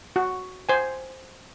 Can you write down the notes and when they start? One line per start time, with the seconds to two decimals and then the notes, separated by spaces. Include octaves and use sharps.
0.16 F#4
0.69 C5 G#5